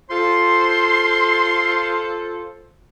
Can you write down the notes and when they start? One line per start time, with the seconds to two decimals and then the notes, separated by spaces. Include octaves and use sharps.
0.10 F4 A4 C5 C6